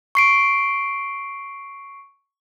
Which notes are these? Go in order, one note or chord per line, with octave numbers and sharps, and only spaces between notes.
C#6 C7 D7